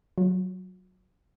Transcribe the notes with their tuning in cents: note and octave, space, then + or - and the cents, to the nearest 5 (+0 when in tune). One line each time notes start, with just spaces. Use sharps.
F#3 +0 F4 +45